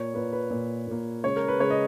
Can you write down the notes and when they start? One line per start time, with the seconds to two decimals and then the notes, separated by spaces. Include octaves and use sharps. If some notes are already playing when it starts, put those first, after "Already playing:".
Already playing: A#2 A#3 C#5
0.14 A#2 A#3 B4
0.33 B4
0.51 A#2 A#3
0.87 A#2 A#3
1.24 C#3 G#3 C#5
1.36 A#4
1.48 B4
1.60 C#3 G#3 C#5
1.70 D#5